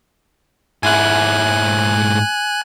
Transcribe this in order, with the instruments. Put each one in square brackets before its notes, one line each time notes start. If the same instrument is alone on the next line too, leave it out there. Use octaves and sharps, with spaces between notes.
[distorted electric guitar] G#2 E4 [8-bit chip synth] G#5 F#6